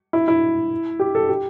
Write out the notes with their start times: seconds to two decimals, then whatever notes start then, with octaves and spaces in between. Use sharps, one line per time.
0.13 E4
0.28 E4
1.00 G4
1.15 A4
1.29 G4